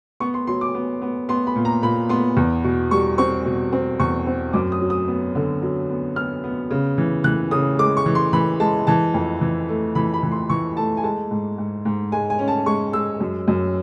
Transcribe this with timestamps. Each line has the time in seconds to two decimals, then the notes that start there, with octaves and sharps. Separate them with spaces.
0.20 B3 C#6
0.34 C6
0.47 F#3 C6
0.61 D6
0.75 B3
1.02 B3
1.29 B3 C6
1.47 B5
1.56 A#2
1.65 A#5
1.83 A#2 B5
2.09 B3 C6
2.37 E2
2.64 B2
2.91 G3 C#6
3.18 C4 C#6
3.45 B2
3.72 C4
4.00 E2 C#6
4.27 C4
4.53 F#2 D6
4.72 D#6
4.80 F#3
4.90 D#6
5.08 B3
5.35 D3
5.62 F#3
5.89 B3
6.16 B3 F6
6.44 B3
6.71 C#3
6.98 E3
7.24 E3 F#6
7.51 C#3 D#6
7.79 G#3 D6
7.97 C#6
8.06 E3
8.15 C6
8.33 E3 B5
8.60 G#3 A5
8.87 E3 A5
9.14 F2
9.41 E3
9.69 A3
9.95 E3 B5
10.14 B5
10.23 E3
10.32 C6
10.50 E3 C#6
10.77 A3 A5
10.97 G#5
11.04 G#3 A5
11.31 G#2
11.58 G#2
11.85 G#2
12.12 G#3 G#5
12.30 G#5
12.39 C#4
12.48 A5
12.66 G#3 C#6
12.93 G#3 E6
13.20 F#2
13.48 F#2